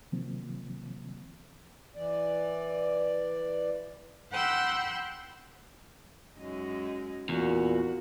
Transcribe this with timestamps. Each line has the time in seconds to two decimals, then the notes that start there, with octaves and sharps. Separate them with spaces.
0.12 C3 D#3 F3 F#3 A#3 C4
1.96 E3 D5
4.31 F#5 G5 B5 C6 E6 F#6
6.38 F#2 G#3 D#4
7.29 E2 A#2 F#4